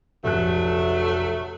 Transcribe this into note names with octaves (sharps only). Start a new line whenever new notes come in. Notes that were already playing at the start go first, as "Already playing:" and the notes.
F1 A#1 F#3 A3 F#6